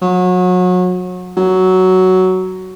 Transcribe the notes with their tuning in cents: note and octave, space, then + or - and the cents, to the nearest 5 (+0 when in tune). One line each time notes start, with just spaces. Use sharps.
F#3 -30
F#3 +10